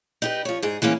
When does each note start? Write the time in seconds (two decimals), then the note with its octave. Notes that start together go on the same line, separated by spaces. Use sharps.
0.22 D#4 G4 B4
0.45 F3 C#5
0.63 G#2 G#4
0.82 E3 G#3 A#3 C#4